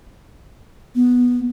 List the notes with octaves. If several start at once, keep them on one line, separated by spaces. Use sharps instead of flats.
B3